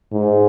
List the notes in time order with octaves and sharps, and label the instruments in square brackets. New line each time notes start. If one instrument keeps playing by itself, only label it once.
[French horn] G#2